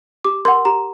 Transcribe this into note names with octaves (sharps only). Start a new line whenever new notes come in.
G4 D6
A#4 F#5 C6
G4 A#5